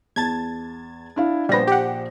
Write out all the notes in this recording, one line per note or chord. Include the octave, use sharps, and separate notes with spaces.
E2 A5 G#6 A6
D4 E4 F5
A#1 G3 B3 C5 A#6
G4 F#5